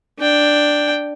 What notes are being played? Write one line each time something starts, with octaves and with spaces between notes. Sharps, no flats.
D4 G5